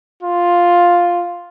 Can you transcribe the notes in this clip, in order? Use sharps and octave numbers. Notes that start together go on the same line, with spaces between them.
F4